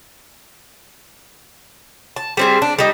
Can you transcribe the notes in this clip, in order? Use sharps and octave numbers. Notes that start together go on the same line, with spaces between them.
A5
G3 C4 G#4
D4
G3 D#4